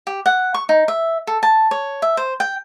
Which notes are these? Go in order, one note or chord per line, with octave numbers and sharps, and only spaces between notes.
G4
F#5
C#6
D#4
E5
A4
A5
C#5
E5
C5
G5